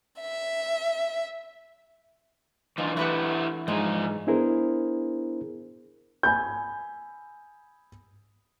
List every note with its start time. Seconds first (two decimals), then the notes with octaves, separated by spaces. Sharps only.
0.20 E5
2.78 E3 D4 D#4 F4
2.97 E3 A3 E4 G4 B4 F#5
3.68 G#2 F3 G#4
4.27 B3 D4 E4 G#4 A#4 C5
6.23 G#5 B5 G6